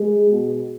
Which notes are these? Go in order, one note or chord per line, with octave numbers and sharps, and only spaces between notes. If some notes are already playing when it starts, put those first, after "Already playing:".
Already playing: G#3 G#4
B2